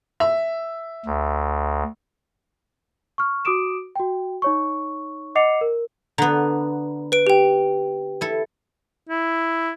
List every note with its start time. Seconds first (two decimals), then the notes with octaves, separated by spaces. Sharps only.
0.20 E5
1.06 D2
3.18 C#6 F6
3.45 F#4 D6 D#6 D7 E7
3.96 F#4 G5
4.42 D#4 C#5 C#6
5.35 D#5 F#5 D6 C7 C#7 F7
5.61 A#4
6.18 D3 B3 A#5
7.12 B4 D7
7.27 G4 G5
8.21 E4 A4
9.09 E4